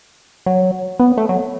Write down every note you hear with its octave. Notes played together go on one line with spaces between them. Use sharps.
F#3
B3
A3
F#3